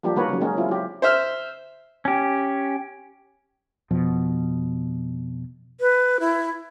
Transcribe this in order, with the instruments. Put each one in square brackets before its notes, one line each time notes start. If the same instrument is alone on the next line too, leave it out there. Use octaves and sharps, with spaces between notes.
[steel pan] F3 G3 A#3 D4 G4
D#3 G3 A#3 F#4 B4 C#5
C#3 F#3
G#3 A#3 C#4 D#4
F#3 C4 E4 F4
F#3 G4
[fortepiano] C5 E5 F6
[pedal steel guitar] C#4 G4
[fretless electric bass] F2 B2 F3
[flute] B4
E4